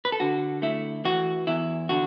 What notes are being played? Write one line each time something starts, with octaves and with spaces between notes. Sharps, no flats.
B4
A4
D3 F#4
A3 E4
E3 F#4
E2 E4
D3 F#4